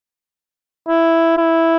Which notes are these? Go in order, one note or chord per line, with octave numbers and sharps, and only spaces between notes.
E4
E4